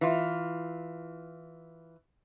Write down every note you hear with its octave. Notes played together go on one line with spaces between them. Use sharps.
E3 F4